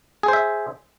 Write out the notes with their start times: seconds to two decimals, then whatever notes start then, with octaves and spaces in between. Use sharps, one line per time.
0.23 G#4
0.28 C5
0.33 E5